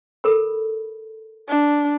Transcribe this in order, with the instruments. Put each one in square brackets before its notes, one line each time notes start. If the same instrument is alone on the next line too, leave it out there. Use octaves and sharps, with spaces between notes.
[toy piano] A4 A#4 B5
[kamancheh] D4